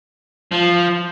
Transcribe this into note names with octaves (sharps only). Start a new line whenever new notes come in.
F3